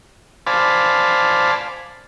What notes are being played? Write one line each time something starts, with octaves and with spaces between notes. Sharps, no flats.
C5 D5 F5 G#5 A5 B5